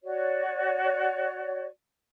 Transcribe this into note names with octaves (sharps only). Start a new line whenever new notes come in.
F#4 C#5 D5